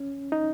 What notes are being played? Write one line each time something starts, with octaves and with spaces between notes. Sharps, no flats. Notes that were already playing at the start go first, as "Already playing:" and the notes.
Already playing: C#4
D#4